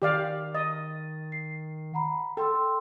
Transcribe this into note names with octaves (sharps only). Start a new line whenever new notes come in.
D#3 G4 D5 F5
D#5 A6 D#7
C7
F#5 A#5 B5
A4 G5 C6 E6